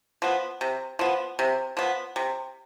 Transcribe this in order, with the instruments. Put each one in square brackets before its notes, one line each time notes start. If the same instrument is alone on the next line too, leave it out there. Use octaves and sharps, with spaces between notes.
[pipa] F3 B3
C3
F3 B3
C3
F3 B3
C3